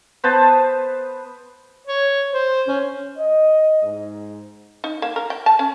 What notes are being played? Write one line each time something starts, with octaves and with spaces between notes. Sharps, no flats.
B3 B4 C5 A5
C#5
C5
C#4
D#5
G#2
D#4
A#3
A#4
G5
A5
C#4